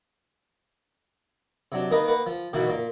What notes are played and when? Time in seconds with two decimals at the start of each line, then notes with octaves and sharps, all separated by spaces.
1.72 C3 F#3 D4
1.91 D#3 A#3 A#4 B4 D#5
2.08 A#3 B4 F#5
2.26 F3
2.53 B2 D#3 E3 A#3 F#4
2.67 A#2 A#3